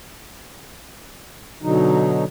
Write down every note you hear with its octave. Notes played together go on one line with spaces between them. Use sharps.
B2 D3 F#3 D#4